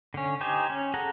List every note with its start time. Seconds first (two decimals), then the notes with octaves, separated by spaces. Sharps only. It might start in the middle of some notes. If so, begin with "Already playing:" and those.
0.14 D3 C#4
0.41 D#4 G4 C5 G#5
0.70 C#4
0.94 G#4 A4 F#5 A#5